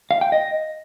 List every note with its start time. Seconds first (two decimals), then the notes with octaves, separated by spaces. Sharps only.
0.11 F5
0.21 G5
0.32 D#5